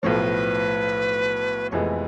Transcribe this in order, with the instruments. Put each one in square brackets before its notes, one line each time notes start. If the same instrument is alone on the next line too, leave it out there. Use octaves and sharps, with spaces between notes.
[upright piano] B1 A2 F3 [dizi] B4 C#5
[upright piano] F1 F2 E3 G#3 B3 [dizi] B4 C#5